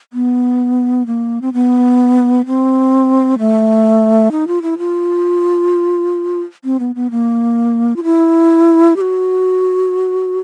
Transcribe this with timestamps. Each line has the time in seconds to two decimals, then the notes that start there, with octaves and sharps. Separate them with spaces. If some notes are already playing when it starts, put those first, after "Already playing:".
0.13 B3
1.06 A#3
1.42 C4
1.53 B3
2.46 C4
3.39 A3
4.32 D#4
4.47 F4
4.62 E4
4.78 F4
6.64 C4
6.80 B3
6.95 B3
7.11 A#3
7.96 F4
8.04 E4
8.96 G4
9.01 F#4